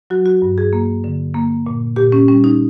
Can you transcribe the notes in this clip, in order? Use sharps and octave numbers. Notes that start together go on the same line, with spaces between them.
F#3 F#4
F#4
G2
G#4
A#3
D3
A#3
A#2
A#2 G4
C#4
G3 C#4
D#4